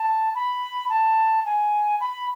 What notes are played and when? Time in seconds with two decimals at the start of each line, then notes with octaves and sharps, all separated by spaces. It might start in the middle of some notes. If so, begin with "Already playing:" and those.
Already playing: A5
0.35 B5
0.90 A5
1.46 G#5
2.01 B5